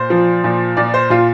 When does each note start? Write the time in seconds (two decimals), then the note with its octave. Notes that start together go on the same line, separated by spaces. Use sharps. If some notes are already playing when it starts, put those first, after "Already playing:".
Already playing: A#2 C5
0.10 F3
0.44 A#2
0.77 A#2 D5
0.94 C5
1.10 A#2 F4